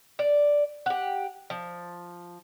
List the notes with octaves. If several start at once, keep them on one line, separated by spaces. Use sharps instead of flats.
D5
G4 F#5
F3